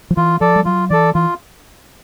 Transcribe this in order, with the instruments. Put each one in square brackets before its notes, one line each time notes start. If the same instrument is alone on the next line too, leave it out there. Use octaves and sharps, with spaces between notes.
[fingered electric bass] F3
[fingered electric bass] E3 [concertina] F4
[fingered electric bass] F3 [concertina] A4 D5
[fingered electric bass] G3
[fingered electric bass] F#3 [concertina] F4
[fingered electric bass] E3 [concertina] A4 D5
[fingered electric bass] E3 [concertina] F4